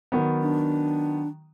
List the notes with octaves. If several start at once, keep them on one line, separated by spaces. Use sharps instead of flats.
D#3 F#3 B3
D4